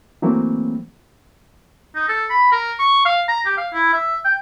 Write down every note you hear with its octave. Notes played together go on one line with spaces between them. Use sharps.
E3 F#3 A3 A#3 C4
D#4
A4
B5
A#4
C#6
F5
A#5
G4
F5
E4
E5
G5